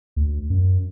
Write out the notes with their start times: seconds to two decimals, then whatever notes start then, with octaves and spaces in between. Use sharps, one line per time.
0.16 D2
0.50 F#2